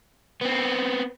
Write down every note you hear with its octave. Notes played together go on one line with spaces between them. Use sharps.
B3 C4